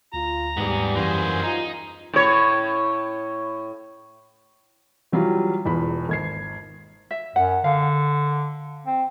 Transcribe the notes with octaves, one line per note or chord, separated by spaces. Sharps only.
D2 F4 A#5
D#2 G#2 G3 B3 G#4
F#2 E3 A#3 F#4 G#4 C5
D#4 F4 A#5
A2 C#5
E3 F#3 G3 F4
E1 E2 F4 B5
G#1 G#6 C7
E5
F#2 F#5
D3 F5
C4